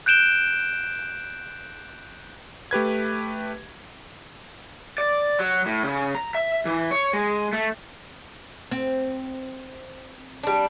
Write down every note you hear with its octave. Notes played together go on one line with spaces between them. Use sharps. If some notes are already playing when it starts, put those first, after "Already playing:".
F#6 G6 D7 E7 G7
A3 G4 B4 G#6
D5
F#3
A2
C#3
A#5
E5
E3
C#5
G#3
A3
C4
G3 D4